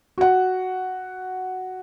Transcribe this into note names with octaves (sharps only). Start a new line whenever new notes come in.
F#4 F#5